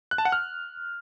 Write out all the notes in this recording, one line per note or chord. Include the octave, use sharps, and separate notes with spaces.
F#6
A5
F#5
F6